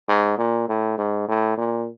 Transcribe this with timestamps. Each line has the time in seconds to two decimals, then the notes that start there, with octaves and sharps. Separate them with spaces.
0.09 G#2
0.38 A#2
0.69 A2
0.98 G#2
1.29 A2
1.57 A#2